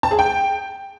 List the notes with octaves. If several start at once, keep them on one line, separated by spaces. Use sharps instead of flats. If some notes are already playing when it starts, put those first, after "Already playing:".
A5
G#4
G5